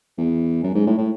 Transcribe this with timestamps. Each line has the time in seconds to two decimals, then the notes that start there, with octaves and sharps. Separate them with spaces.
0.18 E2
0.64 F#2
0.75 G#2
0.86 A2
0.98 A2